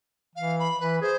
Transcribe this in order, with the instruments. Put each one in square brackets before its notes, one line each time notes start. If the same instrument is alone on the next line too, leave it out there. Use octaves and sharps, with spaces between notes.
[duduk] E3 [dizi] F5
[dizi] B5
[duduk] E3 [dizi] B4
[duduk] G#4 [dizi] C5